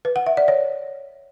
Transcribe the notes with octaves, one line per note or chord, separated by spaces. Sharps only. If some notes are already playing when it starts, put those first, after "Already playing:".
B4
F#5
E5
D5
C#5